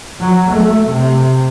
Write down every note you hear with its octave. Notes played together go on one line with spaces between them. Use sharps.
F#3
A3
C3